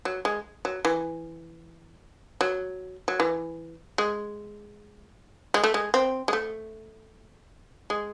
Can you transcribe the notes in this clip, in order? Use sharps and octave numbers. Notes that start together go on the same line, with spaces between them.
F#3
G#3
F#3
E3
F#3
F#3
E3
G#3
G#3
A3
G#3
C4
G#3
A3
G#3